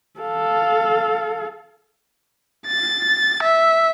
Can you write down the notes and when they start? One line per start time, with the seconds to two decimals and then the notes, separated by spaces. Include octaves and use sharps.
0.20 A4 F5
2.67 A6
3.43 E5